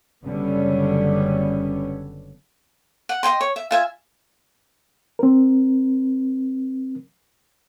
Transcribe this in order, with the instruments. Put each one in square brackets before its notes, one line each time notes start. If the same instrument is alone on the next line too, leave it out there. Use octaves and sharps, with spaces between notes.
[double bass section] F#1 D3 G3 B3 C#4
[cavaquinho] F#5
D#5 F5 G5 C6
C#5
E5
F4 E5 G#5
[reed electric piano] C4 A#4